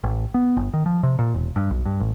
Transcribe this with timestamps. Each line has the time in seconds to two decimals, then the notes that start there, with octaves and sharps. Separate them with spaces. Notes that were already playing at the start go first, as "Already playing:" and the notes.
0.04 A1
0.34 B3
0.57 G1
0.73 D#3
0.86 F3
1.03 C3
1.19 A#2
1.34 E1
1.56 G2
1.70 B1
1.85 G2
2.00 A1